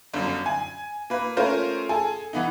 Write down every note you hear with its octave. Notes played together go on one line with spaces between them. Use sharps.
G1 F#2
G#5
A#3 B4
A3 C#4 F4 A#4 C5
G#4 A4 G#5
E3 B3 D#4